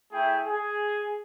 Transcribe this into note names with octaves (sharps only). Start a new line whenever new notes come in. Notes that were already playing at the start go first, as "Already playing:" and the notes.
A3 E4 G#4 G5
G#4